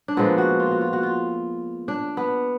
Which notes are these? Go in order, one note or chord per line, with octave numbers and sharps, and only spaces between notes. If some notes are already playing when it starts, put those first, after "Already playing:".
D4
A#2 F3 G#3 B3
F#4
F4
F#4
F4
F#4
F4
D4
B3